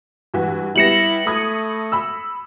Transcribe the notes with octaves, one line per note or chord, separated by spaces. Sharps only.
G2 E3 F#4
G3 B3 E4 A#6 C#7 E7 F#7
A3 B5 D#6 G#6
B5 E6